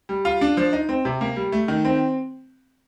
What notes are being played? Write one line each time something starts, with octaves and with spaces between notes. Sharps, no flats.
G3
F4
D4
F3
D#4
C4
C3
A#3
G3
A3
D#3
C4